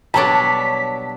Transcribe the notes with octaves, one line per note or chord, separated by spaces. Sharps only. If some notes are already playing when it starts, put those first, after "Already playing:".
B2 F#3 G3 D4 C#5 A5 B6